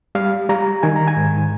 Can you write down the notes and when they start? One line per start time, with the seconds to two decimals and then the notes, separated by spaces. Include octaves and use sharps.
0.15 G3 F5
0.49 G3 A#5
0.83 D#3 G#5
0.96 A#5
1.07 G#5
1.17 G#2